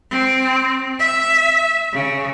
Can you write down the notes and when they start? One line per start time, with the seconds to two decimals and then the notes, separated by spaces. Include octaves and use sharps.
0.10 C4
0.99 E5
1.93 C#3